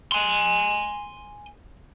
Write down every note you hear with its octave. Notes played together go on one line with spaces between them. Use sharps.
G#5 C6